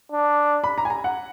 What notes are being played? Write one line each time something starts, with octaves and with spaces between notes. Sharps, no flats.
D4
B5
A#5
G#5
A#5
F#5